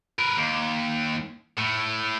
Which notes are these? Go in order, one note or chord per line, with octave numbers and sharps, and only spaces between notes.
A#4 B4
D#2
A2